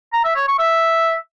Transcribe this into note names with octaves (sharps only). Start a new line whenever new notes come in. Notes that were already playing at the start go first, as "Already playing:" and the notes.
A#5
E5
C#5
C#6
E5